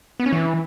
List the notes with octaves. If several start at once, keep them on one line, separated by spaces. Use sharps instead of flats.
B3
C#4
E3